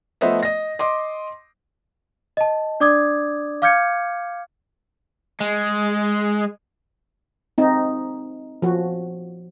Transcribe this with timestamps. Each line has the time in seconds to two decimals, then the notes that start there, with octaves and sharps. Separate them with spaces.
0.21 F3 A3 B3 C5 D#5 E5
0.43 D#5 A#6
0.79 D#5 C6 D6
2.37 D#5 A5
2.80 D4 D5 D6 D#6 G#6
3.62 F5 D6 F6 G6 G#6 C#7
5.40 G#3
7.58 C4 D#4
8.62 F3 F#4